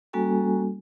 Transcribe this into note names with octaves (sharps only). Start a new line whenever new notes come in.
G3 A#3 C#4 F#4 A4 G#5